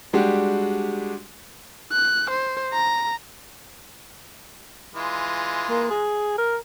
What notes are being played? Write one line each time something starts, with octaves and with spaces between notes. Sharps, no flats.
G3 G#3 D4 F#4 G4
F#6
C5
A#5
E3 G#3 F4
A#3
G#4
A#4